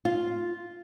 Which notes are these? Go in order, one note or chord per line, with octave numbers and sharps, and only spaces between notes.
F4